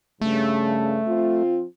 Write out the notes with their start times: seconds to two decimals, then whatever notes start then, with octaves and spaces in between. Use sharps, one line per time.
0.21 G2 C#3 A3
1.08 F3 C4 F4